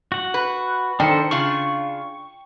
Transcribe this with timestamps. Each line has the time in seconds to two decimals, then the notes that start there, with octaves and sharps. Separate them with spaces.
0.12 F#4 F#5
0.34 B4
1.00 D#3 D4 A4 C5 G5 C#7
1.31 C#3 D4 F4 C#6